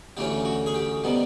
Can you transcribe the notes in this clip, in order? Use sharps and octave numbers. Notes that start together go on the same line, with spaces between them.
D2 C#3 E3 A3 C#4 G4
F#4
G#4
G4
C3 D#3 G3 B3